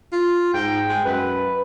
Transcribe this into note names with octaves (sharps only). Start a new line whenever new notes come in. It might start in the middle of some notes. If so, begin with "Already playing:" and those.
F4
G#2 G5
G#3
F#2 B4